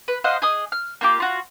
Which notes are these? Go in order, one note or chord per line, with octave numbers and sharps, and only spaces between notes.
B4
C5 D#5 F5 F#5
G#4 D#5 D#6
F6
A#3 F4 G4 D6
F4 F#4